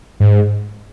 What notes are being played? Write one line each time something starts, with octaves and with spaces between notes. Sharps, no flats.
G#2